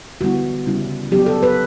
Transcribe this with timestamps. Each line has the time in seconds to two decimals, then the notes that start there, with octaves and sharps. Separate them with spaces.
0.21 D3 G3 B3 E4 F#4
0.67 C#3 G3 C#4 E4
1.11 F#3 B3 D4 G4
1.26 A4
1.43 B4